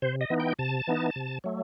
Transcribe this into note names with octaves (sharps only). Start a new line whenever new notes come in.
C3 C5
D#5
E3 B3 D#4
G5
C3 A5
E3 B3 D#4
C3
F#3 A3